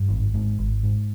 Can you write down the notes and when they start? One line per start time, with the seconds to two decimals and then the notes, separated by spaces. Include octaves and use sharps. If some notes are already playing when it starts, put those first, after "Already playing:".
Already playing: G2
0.09 G#1
0.34 G#2
0.58 G#1
0.83 G#2